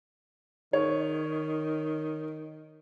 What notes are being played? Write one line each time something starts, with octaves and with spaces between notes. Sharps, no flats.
D#3 C#5